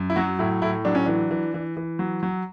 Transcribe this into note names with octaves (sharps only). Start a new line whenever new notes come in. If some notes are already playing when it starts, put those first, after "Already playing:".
Already playing: F#2
E4
F#3 F#4
A2 E4
A2 E4
F#3 D4
C#4
E3 D4
E3
E3
E3
F#3
F#3